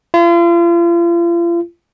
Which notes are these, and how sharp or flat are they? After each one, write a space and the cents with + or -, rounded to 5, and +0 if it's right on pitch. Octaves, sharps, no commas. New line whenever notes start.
F4 -40